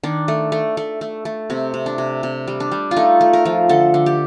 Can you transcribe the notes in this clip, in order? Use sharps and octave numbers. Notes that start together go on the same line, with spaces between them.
D#3 D4
A3
A3
A3
A3
A3
C3 C4
C3
D4
C3
C3
G3
D4
G3
F4
A3 D#4
A3
A#4
F3
D3 A4
D3
G4